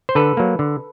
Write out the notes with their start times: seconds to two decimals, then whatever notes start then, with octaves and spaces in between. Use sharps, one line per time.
0.09 C5
0.15 D3 A4 B4
0.37 F#3 A#3
0.59 D3